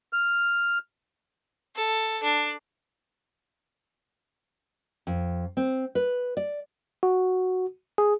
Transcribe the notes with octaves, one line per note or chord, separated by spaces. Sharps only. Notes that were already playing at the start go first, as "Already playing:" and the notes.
F6
A4
D4
F2
C4
B4
D5
F#4
G#4